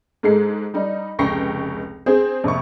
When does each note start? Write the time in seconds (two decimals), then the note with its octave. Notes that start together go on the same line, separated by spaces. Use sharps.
0.23 G#2 G#3 A4 C7
0.74 G3 D#4
1.19 F1 C#2 G5 C#6 A#6 C7
2.06 C4 G#4 C5
2.44 F2 C3 A#3 C#6